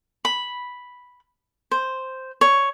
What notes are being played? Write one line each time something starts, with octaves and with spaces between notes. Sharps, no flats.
B5
C5
C#5